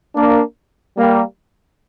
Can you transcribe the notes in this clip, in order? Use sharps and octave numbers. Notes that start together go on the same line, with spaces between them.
A#3 D4
G3 A#3